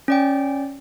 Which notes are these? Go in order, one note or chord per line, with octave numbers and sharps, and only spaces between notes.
C#4 D5 G5